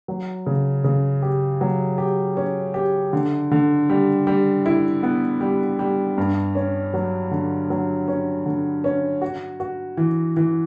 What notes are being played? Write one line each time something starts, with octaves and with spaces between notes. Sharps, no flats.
F#3
C#3
C#3
G4
F#3
G4
C#4
G4
D3
D3
G3
G3
E4
B3
G3
G3
G2
C#4
F#3
D3
F#3
C#4
D3
C#4
F#4
F#4
E3
E3